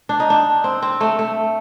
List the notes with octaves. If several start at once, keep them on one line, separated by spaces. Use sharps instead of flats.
D4
D#4
D4
C4
C4
A3
A3